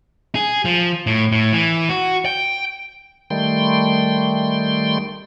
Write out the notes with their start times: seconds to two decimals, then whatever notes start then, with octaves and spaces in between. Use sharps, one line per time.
0.35 G#4
0.65 F3
1.07 A2
1.32 A2
1.53 E3
1.89 F#4
2.25 G5
3.30 D#3 G3 A3 G5 C6